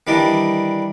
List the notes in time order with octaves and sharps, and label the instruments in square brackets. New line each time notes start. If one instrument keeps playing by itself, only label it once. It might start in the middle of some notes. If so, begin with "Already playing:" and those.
[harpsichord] D#3 E3 G3 D4 D#5